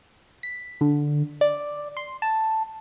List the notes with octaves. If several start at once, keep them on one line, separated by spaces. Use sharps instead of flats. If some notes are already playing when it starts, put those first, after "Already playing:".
B6
D3
D5
C6
A5